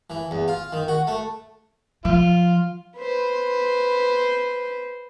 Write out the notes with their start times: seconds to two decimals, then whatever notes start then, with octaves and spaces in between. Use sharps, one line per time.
0.10 E3
0.31 E2
0.48 F4
0.73 D#3
0.88 F#4
1.07 A3
2.05 F3 F4
2.97 B4 C5